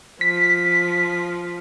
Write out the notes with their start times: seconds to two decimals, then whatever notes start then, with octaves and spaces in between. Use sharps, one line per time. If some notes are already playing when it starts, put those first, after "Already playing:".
0.21 F3 B6